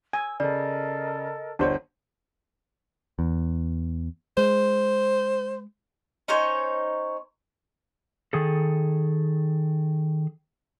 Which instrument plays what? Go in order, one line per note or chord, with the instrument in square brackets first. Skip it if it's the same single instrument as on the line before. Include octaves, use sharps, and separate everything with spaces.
[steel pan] G#5 [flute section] E6
[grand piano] C#3 [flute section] A4 A#4 D#5 [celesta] D5
[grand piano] G1 G3 C#5 [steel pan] D4 C5
[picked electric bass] E2
[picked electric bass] G#3 [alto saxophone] C5
[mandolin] C#4 D#4 C5 C#5
[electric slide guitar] D#3 G#4 A4